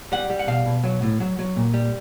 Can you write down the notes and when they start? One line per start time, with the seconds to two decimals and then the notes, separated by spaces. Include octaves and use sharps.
0.12 G3 F#5
0.30 G3
0.39 F#5
0.47 B2 F5
0.66 B2
0.84 F#3
1.02 A2
1.20 F#3
1.39 F#3
1.56 A#2
1.74 G3